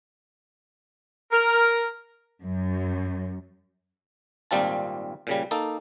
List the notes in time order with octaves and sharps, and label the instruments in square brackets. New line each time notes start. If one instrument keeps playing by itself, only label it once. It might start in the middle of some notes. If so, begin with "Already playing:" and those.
[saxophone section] A#4
[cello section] F#2
[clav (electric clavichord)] G#1 A#2 G3 C4 F4 A5
A#2 C#3 G3
A#3 D#4 A4